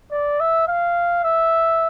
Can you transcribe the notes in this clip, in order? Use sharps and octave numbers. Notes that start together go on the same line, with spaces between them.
D5
E5
F5
E5